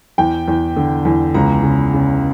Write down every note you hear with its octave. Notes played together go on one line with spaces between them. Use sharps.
E2 G5
E2
D3
E2
C#2 A#5
C#3
C#3